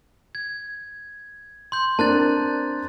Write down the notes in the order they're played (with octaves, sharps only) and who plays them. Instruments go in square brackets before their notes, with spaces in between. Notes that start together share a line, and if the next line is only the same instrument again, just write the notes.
[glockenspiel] G#6
C6 G6
[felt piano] C4 D4 A#4 [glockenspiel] A5 F#6 A6